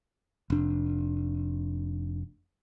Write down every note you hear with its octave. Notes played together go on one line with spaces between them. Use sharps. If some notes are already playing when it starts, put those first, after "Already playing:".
F1 D4